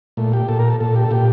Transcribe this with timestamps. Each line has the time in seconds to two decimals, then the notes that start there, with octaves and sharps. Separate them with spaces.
0.17 A#2 A3
0.33 G4
0.48 A#2 A4
0.59 A#4
0.70 A4
0.80 A#2 A4
0.96 G4
1.04 A4
1.11 A#2 G4